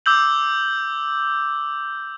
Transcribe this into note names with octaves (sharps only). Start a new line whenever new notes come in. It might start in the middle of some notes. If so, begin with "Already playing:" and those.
D6 E6 G6 F#7